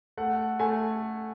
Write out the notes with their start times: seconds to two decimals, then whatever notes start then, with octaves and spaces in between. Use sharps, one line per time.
0.17 A3 F#5
0.59 A3 G#5